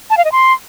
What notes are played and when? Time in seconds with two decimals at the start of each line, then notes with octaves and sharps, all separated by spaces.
0.10 A5
0.17 F5
0.25 D#5
0.32 C6